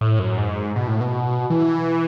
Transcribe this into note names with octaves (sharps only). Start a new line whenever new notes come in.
A2
F#2
G#2
B2
A2
B2
E3